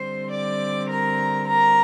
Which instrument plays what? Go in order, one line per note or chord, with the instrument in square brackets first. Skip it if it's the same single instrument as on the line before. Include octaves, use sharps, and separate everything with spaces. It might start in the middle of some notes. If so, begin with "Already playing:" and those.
Already playing: [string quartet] D3 G3 C4 C5 C6
D5 D6
A#4 A#5
A#4 A#5